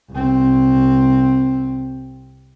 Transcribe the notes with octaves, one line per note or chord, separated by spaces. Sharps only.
C2 C4